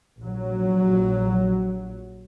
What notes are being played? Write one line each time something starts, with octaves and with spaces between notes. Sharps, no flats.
A#1 F#3